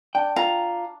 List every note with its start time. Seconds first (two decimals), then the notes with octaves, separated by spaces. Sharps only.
0.15 D4 G5
0.36 F4 A#5